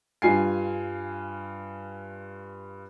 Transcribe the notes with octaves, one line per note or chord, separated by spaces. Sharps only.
G2 F4 G#5 C7